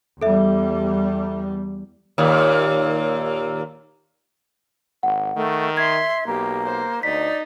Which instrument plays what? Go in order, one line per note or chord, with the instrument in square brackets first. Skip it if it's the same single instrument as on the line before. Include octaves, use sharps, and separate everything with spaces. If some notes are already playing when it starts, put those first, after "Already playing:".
[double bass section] E2 G3 [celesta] A4 E5
[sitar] D#2 A#2
[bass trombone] G#1 [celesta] F#5
[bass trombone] D#3 [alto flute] A3
[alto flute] E5 [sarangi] C6 [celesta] G#6
[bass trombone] B1 [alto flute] A#3 [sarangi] G4
[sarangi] C5
[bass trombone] D2 [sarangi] D#4 [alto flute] D5 [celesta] B6